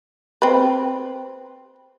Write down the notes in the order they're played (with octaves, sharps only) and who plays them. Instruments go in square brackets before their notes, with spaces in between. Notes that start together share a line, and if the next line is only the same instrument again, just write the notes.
[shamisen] C4 B4